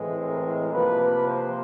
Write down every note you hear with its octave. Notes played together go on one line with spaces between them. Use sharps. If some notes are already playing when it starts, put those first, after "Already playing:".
Already playing: A2 E3 G#3 C4
A#4
C3 F3 A#3 B4
C5